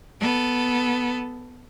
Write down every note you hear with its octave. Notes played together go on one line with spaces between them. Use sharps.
B3 A4